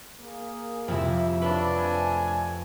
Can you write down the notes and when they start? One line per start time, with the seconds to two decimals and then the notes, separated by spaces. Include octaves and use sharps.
0.19 A#3 G#4
0.88 F2 C3 E4
1.42 D4 B4 C#5 E5
1.75 F2 A3 G#5